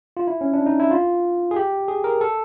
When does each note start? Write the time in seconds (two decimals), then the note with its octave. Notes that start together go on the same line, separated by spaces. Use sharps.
0.17 F4
0.27 E4
0.41 C#4
0.53 D4
0.66 D#4
0.80 E4
0.91 F4
1.51 G#4
1.56 G4
1.88 G#4
2.04 A#4
2.21 A4